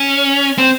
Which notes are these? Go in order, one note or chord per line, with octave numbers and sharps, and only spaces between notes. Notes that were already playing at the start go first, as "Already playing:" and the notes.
Already playing: C#4
C4